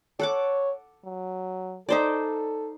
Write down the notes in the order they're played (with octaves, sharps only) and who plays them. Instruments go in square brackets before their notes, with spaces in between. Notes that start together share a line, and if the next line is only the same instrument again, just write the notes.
[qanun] A4 F#5 D6 [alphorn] C#5
[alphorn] F#3
[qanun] D#4 C5 D5 [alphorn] A4